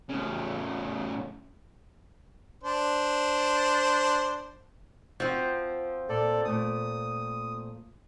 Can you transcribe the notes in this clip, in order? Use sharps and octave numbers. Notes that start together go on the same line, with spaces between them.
A2 C#3
D4 C5
F3 C4 F#4
A#2 A4 D5
A#2 A3 A5 D#6